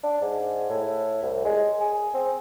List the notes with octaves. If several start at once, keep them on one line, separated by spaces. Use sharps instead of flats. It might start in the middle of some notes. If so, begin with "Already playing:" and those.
D4
G#2
A2
C2
G#3
G#4
C4